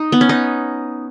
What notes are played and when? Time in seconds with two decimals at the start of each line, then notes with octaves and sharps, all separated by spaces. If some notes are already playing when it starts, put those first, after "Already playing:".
Already playing: D#4
0.12 B3
0.21 C#4
0.29 D#4